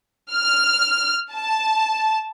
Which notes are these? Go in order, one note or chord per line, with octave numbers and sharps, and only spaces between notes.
F6
A5